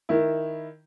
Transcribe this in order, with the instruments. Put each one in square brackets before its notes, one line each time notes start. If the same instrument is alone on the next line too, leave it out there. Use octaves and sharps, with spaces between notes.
[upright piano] D#3 E4